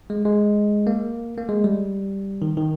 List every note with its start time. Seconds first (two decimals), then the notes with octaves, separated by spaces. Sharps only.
0.10 G#3
0.25 G#3
0.87 A#3
1.38 A#3
1.49 G#3
1.64 G3
2.42 D#3
2.57 D#3